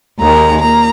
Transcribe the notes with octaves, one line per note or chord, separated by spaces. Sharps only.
D#2 D#3 G#3 A#5
A#2 A#5